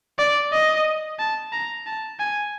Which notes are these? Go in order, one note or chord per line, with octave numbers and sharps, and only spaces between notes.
D5
D#5
A5
A#5
A5
G#5